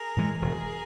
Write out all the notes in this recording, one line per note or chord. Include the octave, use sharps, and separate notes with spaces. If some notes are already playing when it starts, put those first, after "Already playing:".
Already playing: G#4 A#4
A2 E3 G#3
E1 G#4 A#4